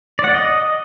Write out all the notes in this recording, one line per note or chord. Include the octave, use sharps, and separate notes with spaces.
D5
F#5
D5
D#5